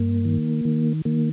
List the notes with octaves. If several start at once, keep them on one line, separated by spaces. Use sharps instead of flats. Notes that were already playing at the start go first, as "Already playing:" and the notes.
Already playing: G2 A#3
D#3
D#3
D#3 A#3